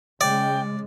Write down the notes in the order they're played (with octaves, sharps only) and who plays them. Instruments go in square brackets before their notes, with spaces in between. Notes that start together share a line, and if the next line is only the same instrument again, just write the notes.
[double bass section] C#3 G#3 [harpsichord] D5 [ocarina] G5